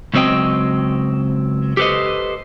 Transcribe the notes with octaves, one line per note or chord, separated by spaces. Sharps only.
C#2 F#3 C4 D#5 G5
G4 A4 B4 C5 D#5